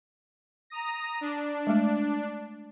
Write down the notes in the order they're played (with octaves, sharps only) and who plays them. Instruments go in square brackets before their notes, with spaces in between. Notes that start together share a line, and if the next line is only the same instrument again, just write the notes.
[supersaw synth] A#5 D#6 A#6
D4
[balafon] G#3 A3